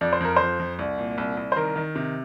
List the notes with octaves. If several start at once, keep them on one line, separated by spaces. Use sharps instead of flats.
F2 D5
C5
F2 A#4
F2 C5
F2
C2
A#2
C2
C2
C5
D#3 A#4
D#3
C3